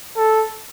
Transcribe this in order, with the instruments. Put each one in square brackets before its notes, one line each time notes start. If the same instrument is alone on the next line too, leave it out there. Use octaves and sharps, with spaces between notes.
[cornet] A4